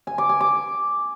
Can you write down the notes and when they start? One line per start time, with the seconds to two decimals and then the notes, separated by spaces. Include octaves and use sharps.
0.07 G#5
0.18 D6
0.29 G#5
0.41 D6